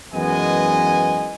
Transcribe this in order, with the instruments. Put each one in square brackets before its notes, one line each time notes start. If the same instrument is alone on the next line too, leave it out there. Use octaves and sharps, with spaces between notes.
[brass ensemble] F#2 E3 G#3 B3 D#5 G#5